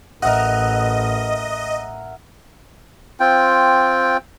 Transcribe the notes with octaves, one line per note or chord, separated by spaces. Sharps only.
A1 A#4 D#5 E5 F#5
C4 F4 G5